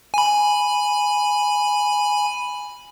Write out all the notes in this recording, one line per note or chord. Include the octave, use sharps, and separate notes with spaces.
G#5 B5